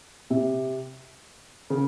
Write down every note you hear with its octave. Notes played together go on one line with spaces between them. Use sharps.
C3
C#3